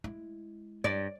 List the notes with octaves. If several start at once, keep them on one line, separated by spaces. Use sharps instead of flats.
G#3 E4
G2 D5